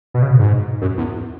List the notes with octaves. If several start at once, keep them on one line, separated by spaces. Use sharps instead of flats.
B2
C#3
B2
G#2
F#2
E2